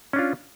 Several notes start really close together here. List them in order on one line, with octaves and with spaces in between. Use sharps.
C#4 D4 F4